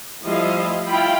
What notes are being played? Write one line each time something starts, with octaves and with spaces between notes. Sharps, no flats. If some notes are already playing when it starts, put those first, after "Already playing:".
F3 G3 A3 E4 D#5 F5
E4 F4 F5 G5 B5